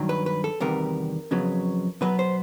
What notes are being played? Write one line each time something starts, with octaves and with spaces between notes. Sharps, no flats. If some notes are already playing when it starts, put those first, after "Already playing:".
Already playing: G2 D#3 F#3
B4
B4
A4
E2 C3 D#3 G3 B3 A#4
F2 C#3 F#3 B3
B2 F#3 B3 B4
C5